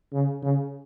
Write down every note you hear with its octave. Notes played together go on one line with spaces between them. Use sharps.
C#3
C#3